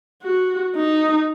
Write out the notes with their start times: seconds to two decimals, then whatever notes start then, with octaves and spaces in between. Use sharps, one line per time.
0.22 F#4
0.76 D#4